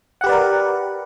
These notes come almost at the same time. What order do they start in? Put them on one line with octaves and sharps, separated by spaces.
F#5 G4 B4 D5 A#4